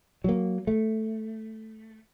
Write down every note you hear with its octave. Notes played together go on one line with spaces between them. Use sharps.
F#3 A#3
A3